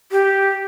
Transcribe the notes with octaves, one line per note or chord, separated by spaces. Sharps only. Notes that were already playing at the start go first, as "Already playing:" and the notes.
G4